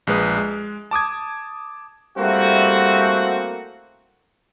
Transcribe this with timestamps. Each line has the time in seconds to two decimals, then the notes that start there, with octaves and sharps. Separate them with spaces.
0.07 A#1 G#3 B4 D#6
0.37 G#3
0.91 A5 D6 D#6 G#6
2.18 G3 A3 A#3 C4 E4 F#4